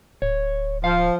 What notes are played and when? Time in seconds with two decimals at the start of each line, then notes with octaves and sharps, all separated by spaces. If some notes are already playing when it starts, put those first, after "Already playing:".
0.22 D1 C#5
0.84 F3 F5